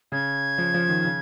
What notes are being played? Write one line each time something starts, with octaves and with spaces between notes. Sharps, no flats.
C#3 G#6
F3
F3
D#3
C#3